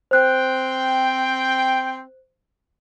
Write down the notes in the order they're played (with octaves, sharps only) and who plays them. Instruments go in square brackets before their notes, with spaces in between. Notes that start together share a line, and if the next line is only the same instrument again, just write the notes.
[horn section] C4 G5 [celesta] C5 F#6